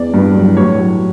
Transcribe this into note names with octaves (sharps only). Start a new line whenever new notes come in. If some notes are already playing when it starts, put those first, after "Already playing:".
Already playing: E2 D5
G2
F#3
A2 C#5
F#3